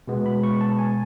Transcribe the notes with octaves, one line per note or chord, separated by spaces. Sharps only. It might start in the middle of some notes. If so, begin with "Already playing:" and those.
B2 G#3 B3
B5
C#6
A5
G#5